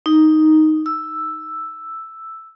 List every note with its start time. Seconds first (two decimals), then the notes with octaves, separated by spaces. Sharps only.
0.06 D#4
0.86 E6